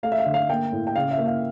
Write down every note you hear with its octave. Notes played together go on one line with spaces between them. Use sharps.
A3 F5
E5
F5
D3
F5
A#3 G5
A2
G5
C#3 F5
E5
A#3
F5